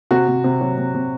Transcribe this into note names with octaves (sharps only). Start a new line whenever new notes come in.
C3 F#4
C3
C3
F#3
C3
C3